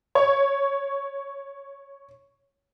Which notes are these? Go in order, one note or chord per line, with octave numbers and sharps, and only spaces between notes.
C#5 C#6